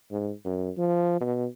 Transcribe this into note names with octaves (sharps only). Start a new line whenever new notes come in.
G#2
F#2
F3
B2